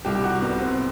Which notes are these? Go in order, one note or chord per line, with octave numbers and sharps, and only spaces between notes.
C2 G4
G4
F#4
C3 G3 B3
C4